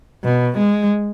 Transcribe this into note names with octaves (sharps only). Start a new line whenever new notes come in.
B2
G#3